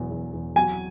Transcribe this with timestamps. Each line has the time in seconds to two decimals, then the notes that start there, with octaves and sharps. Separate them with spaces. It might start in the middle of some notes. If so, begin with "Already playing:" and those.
Already playing: E1 E2 F#3
0.10 E2
0.33 E2
0.56 F#3 G#5